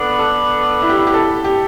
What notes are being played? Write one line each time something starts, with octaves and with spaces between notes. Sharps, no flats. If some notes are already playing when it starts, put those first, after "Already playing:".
Already playing: D3 B3 D4 B4
A4
E4
G4
E4
G4
A4
G4